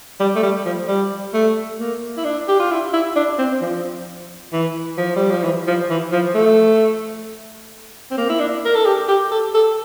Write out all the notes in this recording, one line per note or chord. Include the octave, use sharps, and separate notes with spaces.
G3
A3
G3
F3
G3
A3
A#3
E4
D4
G4
F4
E4
E4
D4
C4
F3
E3
F3
G3
F3
E3
F3
E3
F3
A3
C4
A#3
E4
D4
A#4
A4
G4
G4
A4
A4